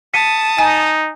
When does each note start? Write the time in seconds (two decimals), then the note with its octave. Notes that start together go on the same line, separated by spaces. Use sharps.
0.14 A5 D#6 B6 C#7 D#7
0.58 D#4 G#5